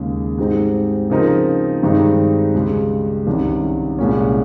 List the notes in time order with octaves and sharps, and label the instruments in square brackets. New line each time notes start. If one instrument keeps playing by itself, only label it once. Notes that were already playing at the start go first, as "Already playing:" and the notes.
Already playing: [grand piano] D#2 C#3 G#3
G#2 G3 C4 D#4
C#3 F3 C4 D#4 A#4
G2 D#3 G#3 C4 D#4
C#2 C#3 G3
C2 C3 D#3 G3 C#4
C2 A#2 G#3 C#4